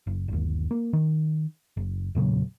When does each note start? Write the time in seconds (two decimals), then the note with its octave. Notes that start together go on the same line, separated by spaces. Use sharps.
0.07 F#1
0.28 G1 D#2
0.71 A#3
0.93 D#3
1.77 F#1
2.15 E1 A#2 C#3 F#3